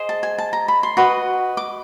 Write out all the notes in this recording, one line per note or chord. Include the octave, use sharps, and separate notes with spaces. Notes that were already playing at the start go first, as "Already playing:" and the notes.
Already playing: G#4 C5 D#5
A5
G#5
A5
A#5
B5
C6
F#4 B4 D#5
D6